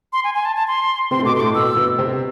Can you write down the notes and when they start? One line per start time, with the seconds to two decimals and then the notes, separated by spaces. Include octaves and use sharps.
0.13 C6
0.24 G#5
0.34 G#5
0.45 A5
0.56 A5
0.67 C6
1.11 C3 C4 C6
1.19 A3
1.25 B2 B3 D6
1.35 C6
1.40 A2 A3 D6
1.54 B2 B3 E6
1.76 B2 B3
1.98 C3 C4